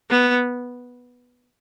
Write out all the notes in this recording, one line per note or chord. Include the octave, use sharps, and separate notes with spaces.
B3